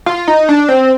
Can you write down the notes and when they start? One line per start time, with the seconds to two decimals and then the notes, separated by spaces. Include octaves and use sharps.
0.06 F4
0.28 D#4
0.49 D4
0.68 C4